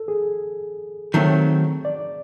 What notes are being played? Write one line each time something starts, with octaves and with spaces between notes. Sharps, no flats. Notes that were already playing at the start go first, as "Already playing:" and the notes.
Already playing: A4
G#4
D#3 F#3 A3 C4
D5